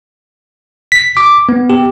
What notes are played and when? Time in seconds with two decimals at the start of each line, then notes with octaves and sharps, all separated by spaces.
0.92 B6
1.17 D6
1.49 B3
1.70 G4